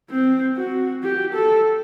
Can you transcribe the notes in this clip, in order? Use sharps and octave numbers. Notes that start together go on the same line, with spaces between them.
C4
F#4
G4
A4